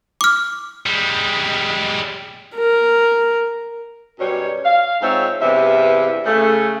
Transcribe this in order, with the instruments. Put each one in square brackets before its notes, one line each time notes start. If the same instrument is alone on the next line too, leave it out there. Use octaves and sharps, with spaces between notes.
[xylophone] D6 F6
[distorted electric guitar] G3 G#3
[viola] A#4
[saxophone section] F#2 B2 G3 C#5
F5
G#2 G#3 C4 F4 C#5 E5
E2 G2 C3 E3 E5
C#3 A3